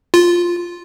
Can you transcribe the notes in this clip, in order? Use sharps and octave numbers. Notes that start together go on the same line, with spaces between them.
F4